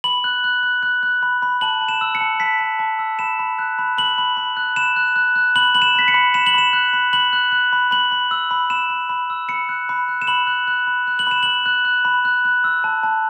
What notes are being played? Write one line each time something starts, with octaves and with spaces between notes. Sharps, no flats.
B5 F#7
F#6
F#6
F#6
F#6
F#6
B5
B5
A5 F#7
A5
E7
E6
C#7
A5
A5 B6
A5
A5
E6
B5 E7
B5
F#6
B5
B5 F#7
B5
B5
F#6
B5 E7
F#6
F#6
F#6
B5 F#7
B5 F#7
E7
B5 B6
C#7
B5
B5 E7
F#7
B5 E7
F#6
B5
B5 F#7
F#6
F#6
B5
B5 F#7
B5
E6
B5
B5 E7
B5
B5
E6
B5 C#7
F#6
B5
F#6
E7
B5 F#7
F#6
F#6
B5
F#6
F#7
B5 E7
B5 F#7
F#6
F#6
B5
F#6
F#6
E6
A5
A5